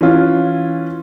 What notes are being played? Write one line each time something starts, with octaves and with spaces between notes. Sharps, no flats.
E3 C#4 F4